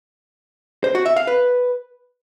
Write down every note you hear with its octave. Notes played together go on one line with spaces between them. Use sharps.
C5
F#4
E5
F5
B4